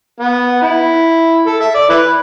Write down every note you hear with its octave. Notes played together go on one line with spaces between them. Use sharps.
B3
E4
A4
E5
D5
E4 B4